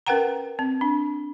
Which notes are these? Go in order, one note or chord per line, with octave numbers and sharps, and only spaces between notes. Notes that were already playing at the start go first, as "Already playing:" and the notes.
C#4 A#4 B4 F#5 G5 A#5
C4
D4